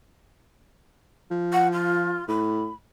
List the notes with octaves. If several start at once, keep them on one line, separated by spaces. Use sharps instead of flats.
F3
F#5
F4
A2 B5